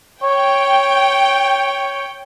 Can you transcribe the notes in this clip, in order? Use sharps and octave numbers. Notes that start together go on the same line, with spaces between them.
C#5 G5